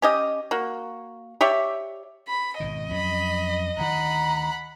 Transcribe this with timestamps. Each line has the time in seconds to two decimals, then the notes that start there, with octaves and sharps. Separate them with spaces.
0.02 C#4 G4 D#5
0.51 A#3 F#4
1.41 G4 C#5 D5 E5
2.29 B5
2.60 G#1 B2 D#3 D#5
2.91 F2 F#3 C#4 B5
3.77 D2 D#3 F#5 A#5 B5